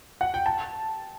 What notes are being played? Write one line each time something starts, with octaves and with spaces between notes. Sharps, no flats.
F#5
G5
A5